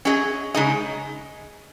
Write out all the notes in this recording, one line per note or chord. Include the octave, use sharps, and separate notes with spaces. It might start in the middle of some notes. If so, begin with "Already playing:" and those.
F#3 C#4 G#4 D#5
C#3 G#3 D#4 G#4 D#5